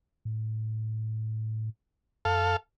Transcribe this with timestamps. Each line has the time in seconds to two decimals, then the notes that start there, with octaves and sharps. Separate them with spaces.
0.25 A2
2.25 F#2 A4 F5